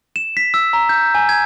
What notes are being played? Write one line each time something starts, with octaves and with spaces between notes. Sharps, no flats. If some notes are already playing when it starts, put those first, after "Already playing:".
E7
B6
E6
A#5
G6
G#5
G#6